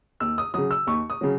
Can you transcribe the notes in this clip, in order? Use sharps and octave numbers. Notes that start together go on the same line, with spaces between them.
D#2 E6
D#6
C#3 F#3 D#6
E6
D#2 C#6
D#6
C#3 F#3